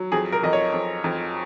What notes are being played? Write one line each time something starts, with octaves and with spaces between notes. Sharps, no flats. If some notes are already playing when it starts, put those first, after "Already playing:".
Already playing: F#3
F2 G#4
A#4
F2 D#5
C#5
F2
F2